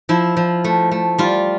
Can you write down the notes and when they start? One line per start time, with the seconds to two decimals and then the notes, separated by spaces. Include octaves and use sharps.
0.09 F3 E4
0.37 F3
0.64 A3
0.91 A3
1.18 G3 F4